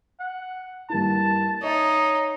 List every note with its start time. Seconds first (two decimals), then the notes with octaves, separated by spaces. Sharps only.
0.20 F#5
0.90 G2 A#3 E4 A5
1.63 D#4 C#5 D#5 E5